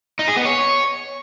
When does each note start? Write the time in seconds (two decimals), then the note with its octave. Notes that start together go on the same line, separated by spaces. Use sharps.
0.19 D#4
0.28 G#4
0.37 B3
0.45 C#5